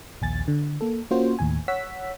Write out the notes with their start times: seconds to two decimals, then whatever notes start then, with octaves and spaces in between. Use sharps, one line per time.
0.21 A#1 D#2 G#5 A6
0.48 D3
0.81 A#3 A4
1.11 A#3 C#4 F4 F#4 C5
1.39 D#2 A2 G#5
1.68 C#5 F#5 E6 B6